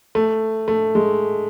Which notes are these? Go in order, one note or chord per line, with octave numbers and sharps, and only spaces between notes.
A3
A3
G#3